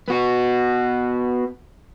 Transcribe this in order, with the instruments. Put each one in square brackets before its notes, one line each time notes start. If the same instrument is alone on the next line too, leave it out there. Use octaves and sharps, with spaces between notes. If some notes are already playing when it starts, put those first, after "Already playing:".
[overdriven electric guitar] B3 F#4